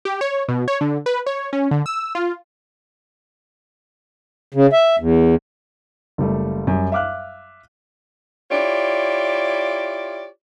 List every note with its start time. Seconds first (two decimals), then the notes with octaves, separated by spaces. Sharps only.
0.05 G4
0.21 C#5
0.49 B2
0.68 C#5
0.81 D3
1.06 B4
1.26 C#5
1.53 C#4
1.71 D3
1.86 E6
2.15 F4
4.54 C#3
4.73 E5
5.00 E2
6.18 F#1 G3 A3
6.67 F#2 G3
6.92 E5 F5 D6 F6 F#6
8.51 E4 F4 G4 C#5 D5